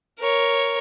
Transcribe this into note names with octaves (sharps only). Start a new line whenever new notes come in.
A#4 C#5